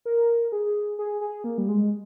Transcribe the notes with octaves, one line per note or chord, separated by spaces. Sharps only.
A#4
G#4
G#4
G#4
A#3
G3
G#3